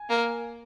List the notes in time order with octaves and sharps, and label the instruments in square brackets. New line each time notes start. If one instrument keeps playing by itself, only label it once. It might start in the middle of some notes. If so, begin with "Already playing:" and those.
Already playing: [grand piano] G#5
[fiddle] A#3